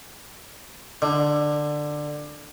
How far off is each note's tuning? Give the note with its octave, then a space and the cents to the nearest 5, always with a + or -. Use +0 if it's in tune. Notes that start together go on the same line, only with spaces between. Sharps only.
D3 +15